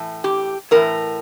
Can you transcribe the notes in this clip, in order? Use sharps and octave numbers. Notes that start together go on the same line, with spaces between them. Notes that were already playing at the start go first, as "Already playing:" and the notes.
Already playing: A2 E3
G4
A2 E3 A#4